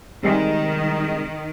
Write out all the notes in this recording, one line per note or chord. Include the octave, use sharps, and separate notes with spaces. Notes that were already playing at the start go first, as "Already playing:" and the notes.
C3 D#3 G3 G#3